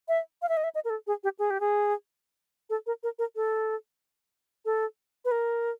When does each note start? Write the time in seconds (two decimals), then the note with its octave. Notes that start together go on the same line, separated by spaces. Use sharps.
0.08 E5
0.42 F5
0.49 E5
0.57 D#5
0.64 E5
0.75 D#5
0.85 A#4
0.90 A4
1.07 G#4
1.24 G4
1.39 G#4
1.50 G4
1.60 G#4
2.70 A4
2.86 A#4
3.03 A#4
3.19 A#4
3.36 A4
4.65 A4
5.25 B4
5.31 A#4